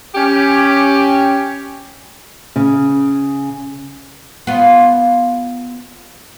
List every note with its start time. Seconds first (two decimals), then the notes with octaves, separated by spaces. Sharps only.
0.15 C#4 G4
2.56 C#3
4.47 B3 F4